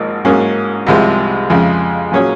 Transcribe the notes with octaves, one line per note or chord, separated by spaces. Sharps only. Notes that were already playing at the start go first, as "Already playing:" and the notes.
Already playing: G#1 G#2 F3 A#3 D#4
G#2 F#3 A#3 C#4 G#4
C2 C3 F3 G#3
F2 C#3 G#3
A#2 F#3 C#4 G#4 C#5